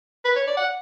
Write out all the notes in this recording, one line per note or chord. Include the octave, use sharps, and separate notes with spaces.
B4
C#5
D5
F#5